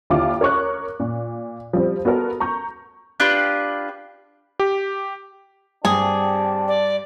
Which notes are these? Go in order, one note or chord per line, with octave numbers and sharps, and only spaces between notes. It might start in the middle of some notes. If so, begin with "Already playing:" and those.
D#2 D3 E4 F4 D6
A#4 C#5 C#6 F#6
A#2
F3 G3 C4
B3 F#4 A4 A#4
A#5 C#6 G6
D4 F4 G4 B4
G4
G2 C4 D4 G4 G#4
D5